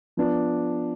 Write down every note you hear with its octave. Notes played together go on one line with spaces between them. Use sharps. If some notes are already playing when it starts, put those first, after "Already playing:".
F3 B3 D4